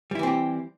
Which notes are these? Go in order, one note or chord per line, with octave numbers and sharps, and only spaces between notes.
E3 G3 C4 E4 G4